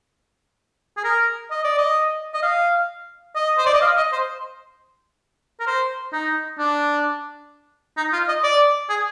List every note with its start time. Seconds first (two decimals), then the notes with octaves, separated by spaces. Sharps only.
0.97 G#4
1.04 A#4
1.51 D#5
1.64 D5
1.78 D#5
2.34 D#5
2.43 F5
3.35 D#5
3.58 C5
3.66 D5
3.74 D#5
3.81 F5
3.97 D#5
4.12 C5
5.60 A#4
5.67 C5
6.13 D#4
6.58 D4
7.97 D#4
8.13 F4
8.28 D#5
8.43 D5
8.89 G#4